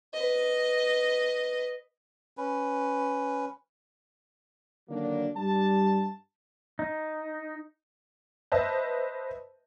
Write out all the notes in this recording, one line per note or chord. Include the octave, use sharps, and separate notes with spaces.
B4 D#5
C#4 B4
D3 D#3 F#3 A#3 D4
G2 G3 D4 A5
D#4
B4 C5 D#5 E5 A5